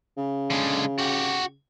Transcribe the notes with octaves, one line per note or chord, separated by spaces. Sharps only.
C#3
D3 G#3
F#4 G4